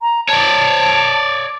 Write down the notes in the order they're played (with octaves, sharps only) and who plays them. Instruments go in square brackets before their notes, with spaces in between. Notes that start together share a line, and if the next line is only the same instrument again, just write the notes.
[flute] A#5
[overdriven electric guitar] C#5 D5 [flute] A5